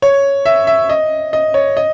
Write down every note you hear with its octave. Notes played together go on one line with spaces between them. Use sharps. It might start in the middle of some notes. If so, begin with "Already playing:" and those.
C#5
E5
E5
D#5
D#5
C#5
D#5